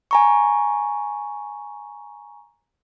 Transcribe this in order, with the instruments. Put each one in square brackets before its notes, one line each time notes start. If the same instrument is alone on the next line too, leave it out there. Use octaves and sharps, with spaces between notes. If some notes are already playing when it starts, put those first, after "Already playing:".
[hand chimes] G#5 A#5 C#6